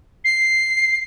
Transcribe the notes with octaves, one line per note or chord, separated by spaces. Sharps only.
C7